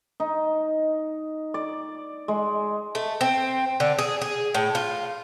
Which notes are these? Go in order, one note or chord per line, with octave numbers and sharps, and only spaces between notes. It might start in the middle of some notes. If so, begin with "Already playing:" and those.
D#4
D5
G#3
A3
C4
D3
G#4
G#4
A2
F4